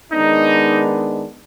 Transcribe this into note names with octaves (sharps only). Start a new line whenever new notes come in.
D#3 G#3 B3 D4 D#4